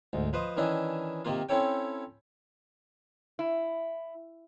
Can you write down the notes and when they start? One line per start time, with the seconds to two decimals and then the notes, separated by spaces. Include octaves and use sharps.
0.13 D2 G#2
0.33 F3 B4 C5 D#5
0.57 D#3 E3 C#4 D4 E4 D#5
1.25 C3 D#3 A#3 F4
1.49 C4 C#4 E4 A4 C#5 G5
3.39 E4